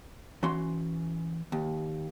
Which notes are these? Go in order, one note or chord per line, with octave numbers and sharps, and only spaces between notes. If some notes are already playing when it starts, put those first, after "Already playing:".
E3 C#4 F#4 C6
D#2